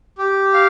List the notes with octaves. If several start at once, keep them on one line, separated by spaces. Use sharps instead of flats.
G4
F5